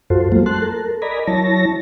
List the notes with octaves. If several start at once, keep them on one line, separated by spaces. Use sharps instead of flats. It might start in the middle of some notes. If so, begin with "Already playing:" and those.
F#2 F4 F#4 A4 C5
F#3 G3 A3 A#3 F4
A5 C6 F#6
A4 A#4
A#4 D5 D#5 G#5 A#5 B5
F#3 E4 C#5 A5 A#6